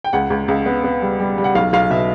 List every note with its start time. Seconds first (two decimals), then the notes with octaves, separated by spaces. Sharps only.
0.04 G5
0.13 C#2 F#5
0.30 C#2
0.48 C#2
0.66 B3
0.84 B3
1.02 G3
1.20 G3
1.38 G3
1.44 F#5
1.55 B1 F5
1.73 B1 F5
1.90 B2 E5